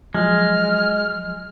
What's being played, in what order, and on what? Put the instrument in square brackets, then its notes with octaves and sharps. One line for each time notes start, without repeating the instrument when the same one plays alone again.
[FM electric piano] F3 F#3 [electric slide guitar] G#3 [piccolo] F6